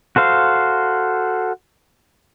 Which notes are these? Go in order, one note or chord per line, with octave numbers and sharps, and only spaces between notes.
F#4 A4 C5 F5